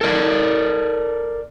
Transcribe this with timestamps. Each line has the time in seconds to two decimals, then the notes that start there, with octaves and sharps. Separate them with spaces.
0.01 A4 A#4 D5